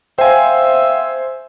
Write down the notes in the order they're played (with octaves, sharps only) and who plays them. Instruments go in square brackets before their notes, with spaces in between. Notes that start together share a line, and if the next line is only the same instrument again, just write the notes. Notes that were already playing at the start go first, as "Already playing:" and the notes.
[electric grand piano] C5 G#5 [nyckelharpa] E5 [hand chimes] F5 G5